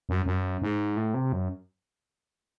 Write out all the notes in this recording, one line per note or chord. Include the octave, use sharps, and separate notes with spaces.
F#2
F#2
G#2
A2
C3
F#2